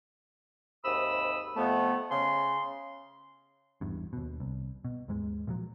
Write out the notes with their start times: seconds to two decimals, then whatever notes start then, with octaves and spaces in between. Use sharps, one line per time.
0.85 D#2 G#2 C3 B5 D#6 E6
1.57 F2 A3 B3
2.11 C#3 C6
3.81 G#1 E2 G2
4.13 D#2 B2
4.40 C2
4.85 B2
5.08 D#2 G#2 G#3
5.47 A#2 F3 F#3